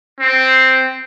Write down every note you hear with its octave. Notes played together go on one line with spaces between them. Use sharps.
C4